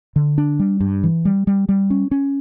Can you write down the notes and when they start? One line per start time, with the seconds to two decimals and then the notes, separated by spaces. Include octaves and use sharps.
0.16 D3
0.38 D4
0.59 G3
0.80 G2
1.03 E3
1.25 G3
1.47 G3
1.69 G3
1.90 C#4
2.11 C#4